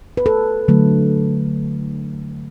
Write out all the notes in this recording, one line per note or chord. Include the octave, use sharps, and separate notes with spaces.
B4
A4
D3 F#3 A3